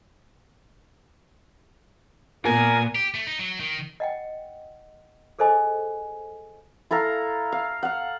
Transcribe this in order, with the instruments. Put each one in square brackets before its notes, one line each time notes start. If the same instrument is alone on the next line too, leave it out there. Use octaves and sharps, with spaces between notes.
[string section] A#2 B3 [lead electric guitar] A#4 [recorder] G#5
[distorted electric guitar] G4
A3
D#4
F#3
D#3
[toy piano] D#5 F#5 G5
G#4 A4 C5 D#5 G#5
[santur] E4 A4 F5 A#5
F5
F5 F#5